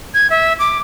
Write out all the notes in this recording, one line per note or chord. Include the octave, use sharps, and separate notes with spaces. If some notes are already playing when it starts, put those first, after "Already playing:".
G#6
E5
D6